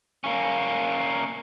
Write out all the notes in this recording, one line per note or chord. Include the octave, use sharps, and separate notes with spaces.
A#3 C#4